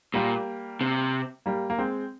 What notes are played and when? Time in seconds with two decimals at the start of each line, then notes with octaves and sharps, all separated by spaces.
0.14 A#2 G3 A#3
0.81 C3
1.46 G3 A#3
1.70 A#3
1.78 G#3 C4